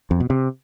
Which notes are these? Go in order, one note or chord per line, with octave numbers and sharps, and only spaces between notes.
F2
B2
C3